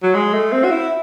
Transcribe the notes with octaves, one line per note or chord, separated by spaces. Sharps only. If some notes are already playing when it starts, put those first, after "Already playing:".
F#3
G#3
A3
C4
F#4
E4